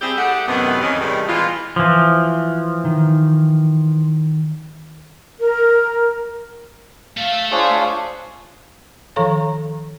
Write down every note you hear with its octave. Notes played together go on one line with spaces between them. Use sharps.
G3 C4 E4 G4 G#4
A3 G4 G#4 D5 F#5
F#2 A2 C3 D#3 F#3 B3
F2 D#3 C#4
E2 A2 C3 D#3 G3
B2 E3 G#3 F4
E3 F3
D#3
A#4
A3 E5 F5
D4 F4 G#4 C5 C#5
D#3 F3 A4 C#5 F5 A#5